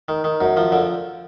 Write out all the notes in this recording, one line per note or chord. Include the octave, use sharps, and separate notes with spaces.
D#3
D#3
F#2
F3
D3